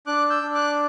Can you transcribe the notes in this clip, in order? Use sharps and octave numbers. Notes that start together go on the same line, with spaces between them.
D4 D6 F#6
E6 G6
D4
D6 F#6